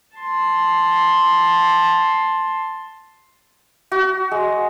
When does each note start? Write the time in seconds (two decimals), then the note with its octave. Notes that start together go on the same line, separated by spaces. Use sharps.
0.17 A5 C6
3.92 F#4
4.31 G#3